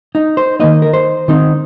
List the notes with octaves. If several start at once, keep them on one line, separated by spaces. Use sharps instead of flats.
D#4
C5
D#3 A#3 D#4 D#5
A#4
C5
D#3 C4 D#4